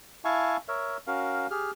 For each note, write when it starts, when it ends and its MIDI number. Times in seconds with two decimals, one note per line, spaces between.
0.25 0.57 64
0.25 0.57 76
0.25 0.57 77
0.25 0.57 80
0.25 0.57 81
0.25 0.57 85
0.68 0.97 70
0.68 0.97 73
0.68 0.97 76
1.07 1.47 61
1.07 1.47 66
1.07 1.47 70
1.07 1.47 77
1.51 1.71 67
1.51 1.71 68
1.51 1.71 89